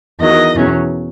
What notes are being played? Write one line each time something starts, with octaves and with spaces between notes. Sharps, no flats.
E2 D#3 F#3 D#5
E2 B2 F#3 C#4